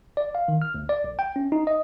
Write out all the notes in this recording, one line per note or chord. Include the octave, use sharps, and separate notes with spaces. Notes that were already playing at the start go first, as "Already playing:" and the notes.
D5
F5
D#3
F6
D2
D5
B1
G5
C#4
D#4
D#5